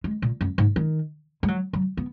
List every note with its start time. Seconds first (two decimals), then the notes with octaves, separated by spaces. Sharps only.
0.04 G#3
0.22 A#2
0.41 F#2
0.58 G#2
0.76 D#3
1.43 G#3
1.48 F#3
1.73 F#3
1.97 B3